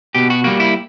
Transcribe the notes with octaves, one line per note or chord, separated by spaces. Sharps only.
B2 G4
F#4
G3 A#3 F#4
E4